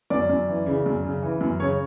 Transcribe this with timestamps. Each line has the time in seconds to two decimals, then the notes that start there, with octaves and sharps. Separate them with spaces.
0.10 F#2 D5
0.30 F#2
0.48 E3
0.66 C#3
0.86 F#2
1.04 C#3
1.22 E3
1.41 F#2
1.60 C#3 C#5